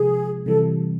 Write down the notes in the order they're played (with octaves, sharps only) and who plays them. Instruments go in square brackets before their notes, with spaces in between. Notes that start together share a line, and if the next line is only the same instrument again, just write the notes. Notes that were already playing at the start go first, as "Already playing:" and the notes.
Already playing: [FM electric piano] C3 F3 G#3 [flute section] G#4
[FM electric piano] C3 E3 G3 [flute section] A4